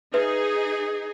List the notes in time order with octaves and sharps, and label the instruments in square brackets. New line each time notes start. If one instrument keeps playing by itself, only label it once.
[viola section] D#4 G#4 [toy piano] B4 E5